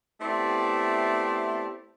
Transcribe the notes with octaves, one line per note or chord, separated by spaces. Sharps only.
A3 B3 C4 E4 G4 D5